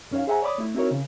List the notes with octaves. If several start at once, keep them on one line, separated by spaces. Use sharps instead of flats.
F#2 C#4 D#4 C#5 F5
G#4 C5 E5 F#5 G#5 A#5
C#5 D5 B5 D6 D#6
A3 E4
C4 D#4 E4 F#4 A#4 C#5
C#3